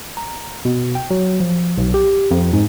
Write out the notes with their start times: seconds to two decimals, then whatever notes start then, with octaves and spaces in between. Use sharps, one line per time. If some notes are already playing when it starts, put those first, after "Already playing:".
0.17 A#5
0.65 B2
0.95 G5
1.11 F#3
1.40 F3
1.78 B1
1.94 G4
2.31 F2
2.53 G#2